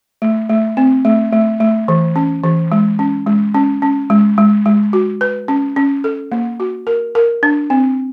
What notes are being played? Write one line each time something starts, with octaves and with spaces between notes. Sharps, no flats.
A3
A3
C4
A3
A3
A3
E3
C#4
E3
G#3
C#4
G#3
C#4
C#4
G#3
G#3
G#3
F#4
B4
C#4
C#4
A4
A#3
F#4
A#4
A#4
D4
C4